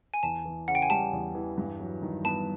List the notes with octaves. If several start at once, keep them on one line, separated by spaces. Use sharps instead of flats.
G#5
E2 A5
E3
C#3 F#5
G5
G#5
G3 A5
E2
E3
G2
F#3
D#3
B3 A5